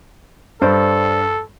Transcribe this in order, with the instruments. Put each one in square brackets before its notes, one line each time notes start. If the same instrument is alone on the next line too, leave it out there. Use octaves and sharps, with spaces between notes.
[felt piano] G2 [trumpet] A4 [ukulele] C5 D5